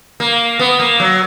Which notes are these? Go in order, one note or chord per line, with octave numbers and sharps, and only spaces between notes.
A#3
B3
A#3
F#3